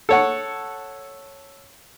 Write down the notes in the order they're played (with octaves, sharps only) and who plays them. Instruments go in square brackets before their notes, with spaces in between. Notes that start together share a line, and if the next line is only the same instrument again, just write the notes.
[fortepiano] A4 C#5 F#5